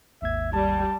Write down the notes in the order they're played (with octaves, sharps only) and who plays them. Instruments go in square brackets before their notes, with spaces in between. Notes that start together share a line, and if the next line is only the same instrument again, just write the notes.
[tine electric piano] G#1 D#2 G#6 [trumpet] E5
[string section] G3 [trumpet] A5